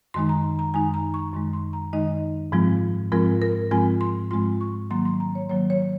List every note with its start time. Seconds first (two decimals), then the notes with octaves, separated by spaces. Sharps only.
0.14 F#2 D#3 G#3 D#4 C6
0.29 A#5
0.44 C6
0.59 A#5
0.74 F#2 D#3 G#3 D#4 G#5
0.94 A#5
1.14 C#6
1.33 F#2 D#3 G#3 D#4 C6
1.53 C6
1.73 A#5
1.93 F#2 D#3 G#3 D#4 D#5
2.52 G#2 F3 G#3 C4 F4
3.12 G#2 F3 G#3 C4 F4 A#4
3.42 A#4
3.71 G#2 F3 G#3 C4 F4 G#5
4.01 C6
4.31 G#2 F3 G#3 C4 F4 C6
4.61 C#6
4.90 D#3 F#3 A#3 C6
5.05 C6
5.20 A#5
5.35 C#5
5.49 D#3 F#3 A#3 C#5
5.70 C#5